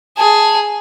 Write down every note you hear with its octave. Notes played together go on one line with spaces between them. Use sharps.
G#4 A5